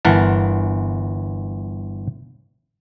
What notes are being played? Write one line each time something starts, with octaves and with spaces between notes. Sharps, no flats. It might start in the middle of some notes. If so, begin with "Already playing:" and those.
G1 E3 A#4 F#5 A5